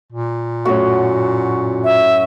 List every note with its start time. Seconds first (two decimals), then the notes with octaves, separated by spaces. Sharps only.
0.12 A#2
0.65 F#2 A2 F#4
1.84 E5